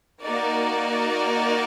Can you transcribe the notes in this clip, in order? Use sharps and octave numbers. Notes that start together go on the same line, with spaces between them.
A#3 D#4 F#4 A#4 D5